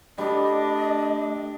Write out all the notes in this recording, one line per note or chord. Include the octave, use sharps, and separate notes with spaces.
G3 A3 D4 D#5